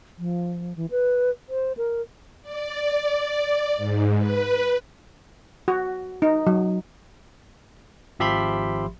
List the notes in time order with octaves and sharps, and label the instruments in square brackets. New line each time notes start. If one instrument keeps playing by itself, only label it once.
[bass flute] F3
E3
B4
C5
A#4
[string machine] D5
G#2
B4
[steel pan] F#4
D#4
F#3
[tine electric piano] G#1 F3 G4 E5 B5 C6